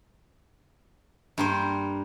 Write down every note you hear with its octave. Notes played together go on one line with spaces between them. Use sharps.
G2 A#3 C5